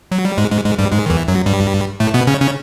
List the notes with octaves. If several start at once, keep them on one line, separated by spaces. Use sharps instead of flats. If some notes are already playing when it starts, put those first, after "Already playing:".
F#3
G3
G#2 G#3
G#2 G#3
G#2 G#3
G2 G3
G#2 G#3
D#3
E2 E3
F#2 F#3
G2 G3
A2 A3
B2 B3
C#3 C#4
C#3 C#4